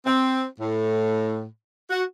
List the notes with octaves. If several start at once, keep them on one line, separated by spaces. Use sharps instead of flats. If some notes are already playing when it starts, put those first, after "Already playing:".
C4
A2
F#4